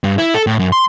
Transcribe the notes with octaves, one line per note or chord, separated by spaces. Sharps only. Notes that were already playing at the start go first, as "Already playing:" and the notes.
G2
E4
A4
A2
F#2
C6